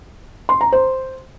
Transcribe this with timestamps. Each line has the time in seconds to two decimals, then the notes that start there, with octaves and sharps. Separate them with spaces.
0.49 C6
0.61 A#5
0.72 C5